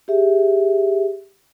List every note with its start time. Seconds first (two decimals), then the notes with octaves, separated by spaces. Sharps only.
0.08 G4 G#4 E5